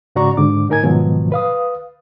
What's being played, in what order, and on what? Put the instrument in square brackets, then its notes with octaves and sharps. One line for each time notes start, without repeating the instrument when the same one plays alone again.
[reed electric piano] G#2 C#3 F#4 D5 A#5 C#6
G#2 D3 D6
A2 D#4 A#4 G#5 G#6
G#2 B2 D#3 F3 F#3
B4 F5 D#6